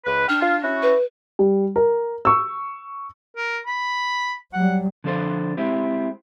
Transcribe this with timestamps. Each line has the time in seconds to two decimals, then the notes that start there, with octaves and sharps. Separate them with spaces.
0.05 C#2 B4
0.29 D4 G5 F6
0.41 F4
0.63 C#4 E4 F#4
0.82 B4
1.39 G3
1.76 A#4
2.25 C#6 E6
3.36 A#4
3.67 B5
4.53 F#3 G3 F#5
5.04 D3 F3 D4 A4 A#4 C5
5.57 G#3 C4 E4 G4